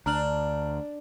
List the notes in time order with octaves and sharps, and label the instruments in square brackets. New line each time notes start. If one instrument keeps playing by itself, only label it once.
[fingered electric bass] D2 [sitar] D4 [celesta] A#5 F6 F#7